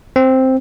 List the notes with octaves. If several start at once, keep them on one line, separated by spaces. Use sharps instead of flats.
C4